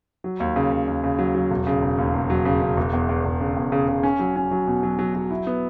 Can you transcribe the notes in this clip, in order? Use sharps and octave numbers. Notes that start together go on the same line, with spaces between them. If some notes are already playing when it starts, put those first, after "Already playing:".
F#3
D#2
C#3
C#3
D#2
C#3
F#3
F#3
E1
C#3
E1
D#2
E1
F#3
C#3
C#3
E1
E2
E2
E1
C#3
E2
C#3
C#3
C#4
F#3
C#4
F#3
B2
F#3
F#3
F#3
E4
B3